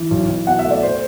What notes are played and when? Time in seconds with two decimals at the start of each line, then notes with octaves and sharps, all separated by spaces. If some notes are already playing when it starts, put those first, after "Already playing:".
Already playing: E3
0.11 B1
0.29 B1
0.47 B2 F#5
0.59 E5
0.65 A3
0.71 D5
0.83 C5